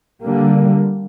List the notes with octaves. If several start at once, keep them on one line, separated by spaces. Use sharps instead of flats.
D3 G3 A#3